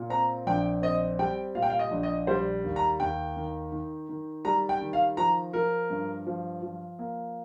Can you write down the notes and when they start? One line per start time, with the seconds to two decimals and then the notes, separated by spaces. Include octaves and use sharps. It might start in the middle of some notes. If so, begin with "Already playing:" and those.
Already playing: A#2
0.10 C4 A#5
0.47 A#1 G5
0.82 C4 D#5
1.19 G3 G5
1.55 A#2 F5
1.62 G5
1.70 F5
1.79 D#5
1.91 A#1
2.03 D#5
2.27 G3 C5
2.64 D#2
2.76 A#5
3.00 D#2 G5
3.37 D#3
3.72 D#3
4.09 D#3
4.45 G3 A#5
4.69 G5
4.81 D#3
4.93 F5
5.17 F3 A#5
5.53 F3 A#4
5.90 G2
6.27 F3
6.63 F3
6.99 A#3